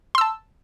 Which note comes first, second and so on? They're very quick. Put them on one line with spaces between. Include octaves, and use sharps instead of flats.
C6 E6 A5